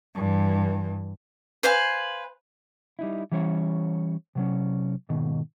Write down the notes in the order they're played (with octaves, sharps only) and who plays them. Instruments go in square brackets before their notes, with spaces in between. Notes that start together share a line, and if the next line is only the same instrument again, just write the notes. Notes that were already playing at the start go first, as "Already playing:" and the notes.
[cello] G2 E3
[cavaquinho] B4 C5 F5 G#5
[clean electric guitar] G3 D#4 E4
E3 G3 C#4 C#5
C3 F#3 C#4
D#2 G#2 B2 D#3